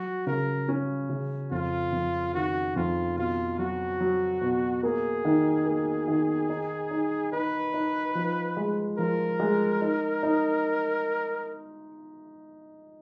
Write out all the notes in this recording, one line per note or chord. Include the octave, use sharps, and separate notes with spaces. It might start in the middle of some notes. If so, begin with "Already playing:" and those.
Already playing: F#3 F#4
C#3 A#4
C#4
C#3
F2 F4
F2
D#3 F#4
F2 F4
B2 F4
F#3 F#4
F#3
B2
A#3 G#4
D#3
A#3
D#3
D#4
D#4
D#4 B4
D#4
F3
G#3
F3 A#4
G#3
D#4
D#4